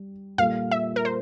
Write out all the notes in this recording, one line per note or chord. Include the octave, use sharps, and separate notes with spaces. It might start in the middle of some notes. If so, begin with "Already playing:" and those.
Already playing: G3
A#2 G3 A#3 F4 A4 F5
E5
A#4
C5